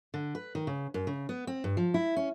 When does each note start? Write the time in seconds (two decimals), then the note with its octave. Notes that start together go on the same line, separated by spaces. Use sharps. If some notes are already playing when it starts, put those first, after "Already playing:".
0.14 D3
0.35 B4
0.55 D#3
0.67 C#3
0.94 F#2
1.07 C#3
1.29 B3
1.47 C4
1.64 G2
1.77 F3
1.94 E4
2.16 C#4